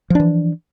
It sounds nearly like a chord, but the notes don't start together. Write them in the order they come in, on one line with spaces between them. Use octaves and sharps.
F3 D4 E3